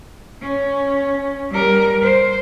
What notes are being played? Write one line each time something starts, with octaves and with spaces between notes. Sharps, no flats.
C#4
G3 A#4
C5